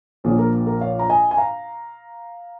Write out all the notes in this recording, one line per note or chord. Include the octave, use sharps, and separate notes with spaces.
A#1 A#2 F3 G#4 C#5
A#4
A#4
C#5 F5
A#5
D#5 G#5
G#5
F5 A#5